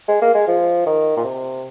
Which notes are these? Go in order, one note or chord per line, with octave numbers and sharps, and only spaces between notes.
G#3
A#3
G#3
F3
D#3
A#2
C3